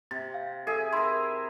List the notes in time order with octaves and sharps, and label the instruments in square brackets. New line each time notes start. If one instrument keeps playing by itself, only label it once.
[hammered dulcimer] C3 [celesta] A6
[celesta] F5
[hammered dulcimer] G#4 E5 [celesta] A4
[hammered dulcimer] E4 A#4 [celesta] C6